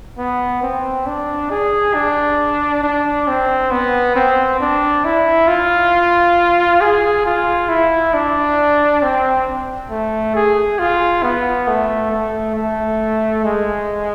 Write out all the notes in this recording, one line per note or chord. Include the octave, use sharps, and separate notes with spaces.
B3
C4
D4
G#4
D4
D4
C4
B3
C4
D4
E4
F4
G#4
F4
E4
D4
C4
A3
G#4
F4
B3
A3
A3
A3
G#3